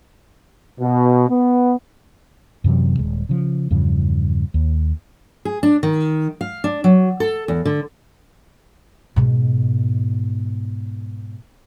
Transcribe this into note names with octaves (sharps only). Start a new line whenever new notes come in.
B2
B3
F#2 C3 E3 F#3
D#1 G#3
C#3 F3
E2 G2 C#3 F3
D#2
G#4
D4
D#3
F5
D4
F#3
A4
E2
D3
G#2 B2